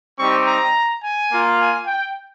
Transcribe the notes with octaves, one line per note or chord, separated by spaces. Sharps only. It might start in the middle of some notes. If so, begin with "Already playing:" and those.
G3 C4 D#4 G4 C#6
A#5
G#5
A#3 F4
G#5
G5